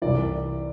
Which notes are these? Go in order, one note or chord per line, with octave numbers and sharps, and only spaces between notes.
C2 C3 E3 D5